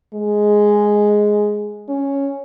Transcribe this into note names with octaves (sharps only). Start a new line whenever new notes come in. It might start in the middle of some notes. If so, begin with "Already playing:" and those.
G#3
C#4